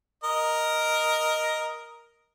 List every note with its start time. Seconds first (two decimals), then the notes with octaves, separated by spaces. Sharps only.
0.24 A#4 D#5